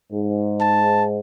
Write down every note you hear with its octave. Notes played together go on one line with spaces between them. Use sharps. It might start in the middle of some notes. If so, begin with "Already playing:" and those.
G#2
A5